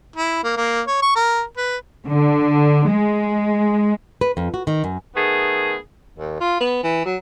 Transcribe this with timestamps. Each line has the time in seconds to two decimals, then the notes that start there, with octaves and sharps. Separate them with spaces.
0.16 E4
0.44 A#3
0.57 A#3
0.87 C#5
1.02 C#6
1.16 A#4
1.57 B4
2.06 D3
2.86 G#3
4.21 B4
4.37 F2
4.54 F#4
4.67 D#3
4.84 F#2
5.15 D#3 A3 B3 G#4
6.18 D#2
6.41 F4
6.61 B3
6.83 E3
7.05 F#3